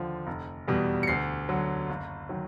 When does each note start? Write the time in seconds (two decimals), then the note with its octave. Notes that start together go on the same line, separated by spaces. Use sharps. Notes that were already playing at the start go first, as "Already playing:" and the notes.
Already playing: D#2 D3 F3
0.27 F1
0.68 E2 B2 G3
1.03 C#7
1.07 D2 C7
1.49 D3 F#3
1.89 F#1
2.29 D#3 F#3